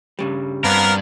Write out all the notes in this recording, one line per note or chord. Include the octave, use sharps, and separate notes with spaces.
G2 C#3 G3
G2 B3 C4 D4 A#4 F5